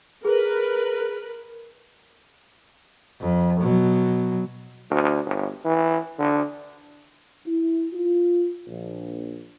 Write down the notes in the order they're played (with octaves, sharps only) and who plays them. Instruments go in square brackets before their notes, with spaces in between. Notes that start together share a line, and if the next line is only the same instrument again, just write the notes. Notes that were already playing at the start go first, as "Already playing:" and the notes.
[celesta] G#4 [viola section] A#4 B4
[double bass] F2
B2 F#3
[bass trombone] D2
G1
E3
D3
[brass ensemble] E4
F4
A#1